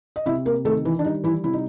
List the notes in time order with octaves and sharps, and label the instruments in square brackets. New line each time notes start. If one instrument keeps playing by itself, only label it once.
[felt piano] D#5
C3 E4 E5
A#3 A#4
D#3 A3 A4
E3 E4
D4
G3 D#4
E3 E4
C3 E4
D#4